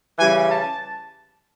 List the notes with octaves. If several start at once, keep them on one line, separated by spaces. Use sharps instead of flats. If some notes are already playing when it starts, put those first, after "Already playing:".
C#3 E3 G3 G#5
A5